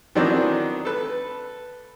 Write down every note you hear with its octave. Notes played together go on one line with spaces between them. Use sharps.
D#3 E3 F#3 B3 C4 D4
A4 B4